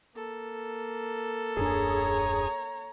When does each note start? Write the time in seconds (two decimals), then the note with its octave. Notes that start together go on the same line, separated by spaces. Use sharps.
0.15 A#3 A4
1.57 D#1 F#2 D4 G#4 C#5 A#5